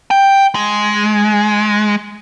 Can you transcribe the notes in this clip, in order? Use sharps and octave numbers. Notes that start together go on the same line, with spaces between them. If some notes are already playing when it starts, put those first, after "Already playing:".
G5
G#3